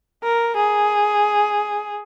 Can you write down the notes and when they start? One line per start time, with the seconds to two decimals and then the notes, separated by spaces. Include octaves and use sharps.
0.24 A#4
0.57 G#4